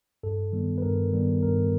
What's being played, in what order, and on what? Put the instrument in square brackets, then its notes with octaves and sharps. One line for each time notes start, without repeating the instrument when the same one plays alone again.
[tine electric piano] G2 A4
D#3 G3 B3
B4
G2 A#4
D#3 G3 B3
G2 A#4